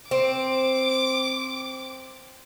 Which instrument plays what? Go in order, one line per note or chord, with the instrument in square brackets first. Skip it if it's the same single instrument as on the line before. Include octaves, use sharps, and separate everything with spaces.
[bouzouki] C4 [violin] D6